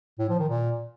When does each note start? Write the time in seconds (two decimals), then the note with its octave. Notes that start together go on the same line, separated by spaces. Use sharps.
0.19 A2
0.29 F3
0.39 D#3
0.49 A#2